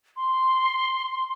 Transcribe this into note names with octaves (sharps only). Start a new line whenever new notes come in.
C6